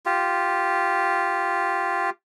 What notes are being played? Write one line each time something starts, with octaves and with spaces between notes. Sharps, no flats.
F4 G4